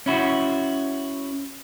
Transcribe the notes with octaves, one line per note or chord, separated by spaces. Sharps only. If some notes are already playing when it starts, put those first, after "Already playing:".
C#4 E4 F#4